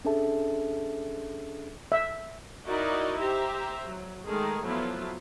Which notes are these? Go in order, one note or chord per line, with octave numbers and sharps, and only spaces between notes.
C#4 D4 G#4 A4 E5 A5
E5
D#4 E4 F#4 A#4 D5 D#5
G4 C5 E5 A#5
F#3
D#3 G#3 A3 G#4 A#4
F3 F#3 A3 B3 E4 F4